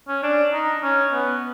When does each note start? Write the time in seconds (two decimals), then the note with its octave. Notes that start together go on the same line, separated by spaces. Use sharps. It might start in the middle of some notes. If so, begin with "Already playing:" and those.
0.08 C#4
0.23 D4
0.53 D#4
0.83 C#4
1.13 B3